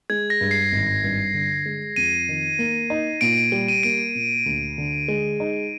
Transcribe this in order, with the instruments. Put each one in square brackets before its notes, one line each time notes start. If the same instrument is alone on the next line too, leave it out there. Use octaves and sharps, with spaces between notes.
[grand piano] G#3 [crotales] G#6
[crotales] A#6
[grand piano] G2
[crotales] C7
[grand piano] G#1
G2
D3
G#3
[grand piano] F2 [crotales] D#7
[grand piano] D#3
A#3
D#4
[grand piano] A#2 [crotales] D7
[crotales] D7
[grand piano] G3
[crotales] D#7
[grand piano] A#3 [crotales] D7
[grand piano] A#2
D2
D3
G#3
D#4